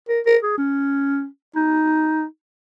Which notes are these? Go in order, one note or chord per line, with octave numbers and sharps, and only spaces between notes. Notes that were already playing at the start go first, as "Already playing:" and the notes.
A#4
A#4
G#4
C#4
D#4